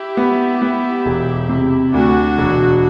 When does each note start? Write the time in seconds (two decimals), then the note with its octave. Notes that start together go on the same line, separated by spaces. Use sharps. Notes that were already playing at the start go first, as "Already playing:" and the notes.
Already playing: E4 G4
0.17 B3
0.62 B3
1.06 E1
1.49 C3
1.93 D2 D4 F#4
2.38 E1